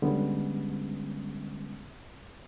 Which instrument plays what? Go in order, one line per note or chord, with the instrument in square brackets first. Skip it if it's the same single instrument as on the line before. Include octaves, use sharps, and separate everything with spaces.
[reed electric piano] D3 G3 G#3 B3 C#4